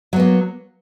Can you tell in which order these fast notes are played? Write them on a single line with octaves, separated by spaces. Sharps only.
F#3 B3 A#3